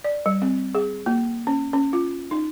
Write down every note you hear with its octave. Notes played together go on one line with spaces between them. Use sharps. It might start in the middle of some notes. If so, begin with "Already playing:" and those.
D5
G3
C4
G#4
A#3
C#4
C#4
F4
D#4